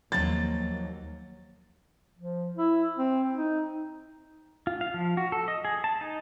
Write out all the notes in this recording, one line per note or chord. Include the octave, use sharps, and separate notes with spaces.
D#2 F3 F#3 A6
F3
E4
C4
D#4
F4
F5
F3
F#4
A4
D#5
G#4
A5
D#4